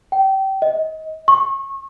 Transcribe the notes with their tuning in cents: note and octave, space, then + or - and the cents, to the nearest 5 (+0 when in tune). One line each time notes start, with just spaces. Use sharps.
G5 -25
D#5 +25
C#6 -30